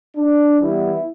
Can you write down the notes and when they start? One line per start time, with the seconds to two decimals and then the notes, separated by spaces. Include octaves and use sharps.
0.17 D4
0.61 E3 G3 B3 E4